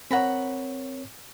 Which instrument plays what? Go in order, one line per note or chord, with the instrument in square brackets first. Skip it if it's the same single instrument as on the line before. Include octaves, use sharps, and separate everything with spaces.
[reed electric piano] C4 A#4 C#5 [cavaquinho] F#5 A#5 B5